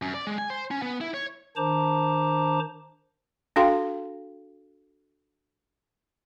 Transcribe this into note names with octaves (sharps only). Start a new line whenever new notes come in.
F#2
D5
G#3
G#5
C5
C#4
B3
E4
C#5
D#3 D4 C5 A5 A#5 D6
D4 F#4 A4 F5 G5 C6